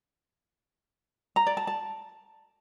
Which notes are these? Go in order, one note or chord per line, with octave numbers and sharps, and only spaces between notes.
A#5
D5
A5
A5